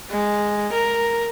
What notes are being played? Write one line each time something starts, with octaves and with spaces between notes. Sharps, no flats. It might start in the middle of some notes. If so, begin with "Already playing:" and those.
G#3
A#4